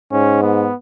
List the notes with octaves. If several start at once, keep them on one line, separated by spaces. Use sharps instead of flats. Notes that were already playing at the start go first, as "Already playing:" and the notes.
G#2 C#4
B3